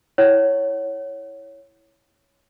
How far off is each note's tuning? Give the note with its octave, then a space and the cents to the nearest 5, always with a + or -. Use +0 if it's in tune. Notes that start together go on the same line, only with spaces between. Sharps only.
E4 +0 C#5 +0 F#5 +15